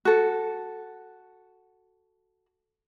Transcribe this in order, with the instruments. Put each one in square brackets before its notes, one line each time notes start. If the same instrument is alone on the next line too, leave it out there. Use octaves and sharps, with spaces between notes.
[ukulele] F#4 A4